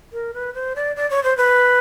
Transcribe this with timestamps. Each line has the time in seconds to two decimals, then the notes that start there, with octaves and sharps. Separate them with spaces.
0.13 A#4
0.34 B4
0.54 C5
0.76 D5
0.96 D5
1.10 C#5
1.24 C5
1.37 B4